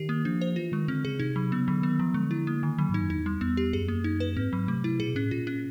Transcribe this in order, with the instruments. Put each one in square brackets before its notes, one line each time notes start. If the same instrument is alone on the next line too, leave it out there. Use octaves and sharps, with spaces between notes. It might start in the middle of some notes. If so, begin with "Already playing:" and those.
Already playing: [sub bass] D#3 [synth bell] G4
[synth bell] A#3
[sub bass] F3 [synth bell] D4
[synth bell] C5
[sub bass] E3 [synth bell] F4
[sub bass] D#3 [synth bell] G#3
[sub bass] D3 [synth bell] C4
[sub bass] C#3 [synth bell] G#4
[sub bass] C3 [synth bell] D#4
[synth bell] F#3
[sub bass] C#3 [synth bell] B3
[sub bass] D3 [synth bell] F#3
[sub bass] D#3 [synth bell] B3
[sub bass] E3 [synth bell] F3
[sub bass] D3 [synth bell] G#3
[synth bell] E4
A#3
D#3
[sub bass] D3 [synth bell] F#3
[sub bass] G#2 [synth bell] D#4
[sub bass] F#2
[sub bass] E2 [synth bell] D#4
[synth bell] G3
[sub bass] E2 [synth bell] B3
[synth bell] G4
[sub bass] F#2 [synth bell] G#4
[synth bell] A#3
D#4
B4
[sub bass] G#2 [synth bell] C4
[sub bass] G#2 [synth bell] F#3
[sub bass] C3 [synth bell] A3
[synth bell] E4
[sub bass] B2 [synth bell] G#4
[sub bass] A2 [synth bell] C#4
[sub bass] A#2 [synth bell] F4
[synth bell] C#4